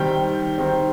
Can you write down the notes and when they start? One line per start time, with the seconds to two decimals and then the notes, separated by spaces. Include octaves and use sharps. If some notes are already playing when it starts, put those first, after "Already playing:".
Already playing: D#3 G3 C4 G5
0.58 D#3 G3 C4